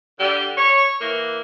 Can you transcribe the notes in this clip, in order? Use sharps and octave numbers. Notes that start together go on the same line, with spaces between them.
D3 G3
C#5
E3 A#3